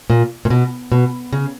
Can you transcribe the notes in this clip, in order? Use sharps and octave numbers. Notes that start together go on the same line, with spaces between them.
A#2
A#2
B2
B2
C#3